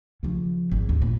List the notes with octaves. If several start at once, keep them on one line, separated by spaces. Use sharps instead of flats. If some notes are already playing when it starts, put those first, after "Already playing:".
C#3 F3
G#1
D#2
A#2